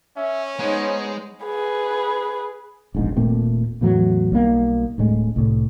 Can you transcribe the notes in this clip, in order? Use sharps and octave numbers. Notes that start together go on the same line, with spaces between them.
C#4 E5
G#3 B3 D#4 C5 C#5
G#4 B4
E1 A#1 G#2
D#1 A#2 A3 C4
E2 A2 E3 F#3
B1 G3 A#3
D1 A2 G#3
C2 A2